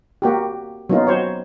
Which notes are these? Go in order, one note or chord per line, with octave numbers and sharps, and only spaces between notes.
A#3 F#4 G4
F#3 A#3 B3 D#4 F4
F#4 C5 C#5